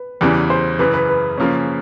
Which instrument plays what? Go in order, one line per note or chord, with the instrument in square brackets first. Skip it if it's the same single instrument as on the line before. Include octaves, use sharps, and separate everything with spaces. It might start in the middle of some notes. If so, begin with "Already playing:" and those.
Already playing: [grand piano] B4
[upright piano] E2 C#3 E3 G3
[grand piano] C5
[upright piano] F#2 C#3 E3 [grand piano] B4
[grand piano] B4
B4
[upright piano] C#3 F3 A#3 C#4